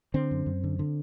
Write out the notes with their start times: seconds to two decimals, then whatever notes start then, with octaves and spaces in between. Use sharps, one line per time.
0.14 D3 C4
0.31 F#2
0.46 F#2
0.64 D3
0.79 D3